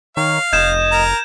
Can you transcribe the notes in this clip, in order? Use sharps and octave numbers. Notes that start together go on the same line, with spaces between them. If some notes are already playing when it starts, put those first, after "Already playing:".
D#3 C#5 F5
F1 D#5 G6 G#6 E7
A#4 A#5